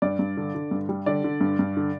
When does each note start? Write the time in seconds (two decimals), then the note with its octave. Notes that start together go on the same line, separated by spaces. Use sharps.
0.02 G2 D5
0.19 G2
0.37 D3
0.55 D3
0.71 G2
0.89 G3
1.06 D3 D5
1.24 D3
1.41 G2
1.59 G2
1.77 D3